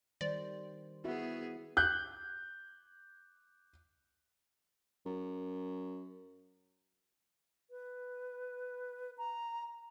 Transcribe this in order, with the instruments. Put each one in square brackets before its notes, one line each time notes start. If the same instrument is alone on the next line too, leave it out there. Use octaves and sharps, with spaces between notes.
[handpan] D#3 G3 C5 [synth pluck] D5
[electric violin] B3 G#4 [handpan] E4 F#4 E5
[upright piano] F#6 G6
[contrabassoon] F#2
[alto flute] B4
A#5